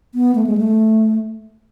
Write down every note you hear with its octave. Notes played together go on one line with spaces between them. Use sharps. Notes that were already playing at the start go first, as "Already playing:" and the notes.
B3
A3
G#3
A3